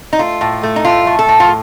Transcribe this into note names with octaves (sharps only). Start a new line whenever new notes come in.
D#4
A3 F4
A2
A3
D#4
A2 F4
A3
A4
A2
F4